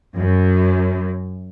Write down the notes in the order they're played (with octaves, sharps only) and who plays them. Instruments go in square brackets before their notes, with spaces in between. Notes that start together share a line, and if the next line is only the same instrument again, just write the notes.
[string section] F#2